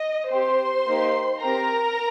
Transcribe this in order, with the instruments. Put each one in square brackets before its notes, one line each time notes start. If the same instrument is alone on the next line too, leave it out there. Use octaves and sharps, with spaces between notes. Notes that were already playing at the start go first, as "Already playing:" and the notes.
Already playing: [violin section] D#5
C4 G4 C5 C6
A#3 D#4 G4
C4 G4 A#4 A#5